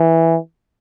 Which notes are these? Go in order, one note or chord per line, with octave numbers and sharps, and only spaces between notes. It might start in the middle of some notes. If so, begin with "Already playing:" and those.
Already playing: E3